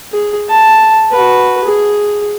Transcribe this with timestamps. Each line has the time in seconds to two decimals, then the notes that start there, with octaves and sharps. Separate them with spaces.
0.12 G#4
0.49 A5
1.11 F#4 B4
1.65 G#4